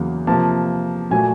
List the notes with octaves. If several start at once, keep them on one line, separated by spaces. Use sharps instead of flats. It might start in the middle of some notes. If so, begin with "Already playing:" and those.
Already playing: E2 C#3 F#3 A#3
C3 F3 A#3 A5
A#2 F#3 A3 G#5